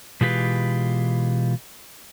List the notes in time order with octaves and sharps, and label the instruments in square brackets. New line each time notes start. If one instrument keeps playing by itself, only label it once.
[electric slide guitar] B2 E3 G#3 F4 G4 B4